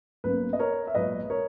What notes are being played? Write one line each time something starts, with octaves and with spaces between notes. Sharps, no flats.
B1 B2 A#3 C#4 B4
D#5
A#4 C#5
E5
B1 A#2 G#3 B4 D#5
A#4 C#5